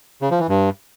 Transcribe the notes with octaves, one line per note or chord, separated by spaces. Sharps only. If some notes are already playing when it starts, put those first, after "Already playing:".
C#3
F3
E3
G2